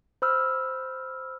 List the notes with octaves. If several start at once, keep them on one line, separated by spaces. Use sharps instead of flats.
C5 B5 E6 F6